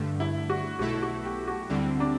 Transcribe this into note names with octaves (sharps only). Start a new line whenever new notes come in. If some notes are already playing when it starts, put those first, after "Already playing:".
Already playing: G2 D3 A3
E4
F#4
B1 B2 A3 E4 F#4 A4
F#4
G4
F#4
D2 D3 G3 C4 E4
D4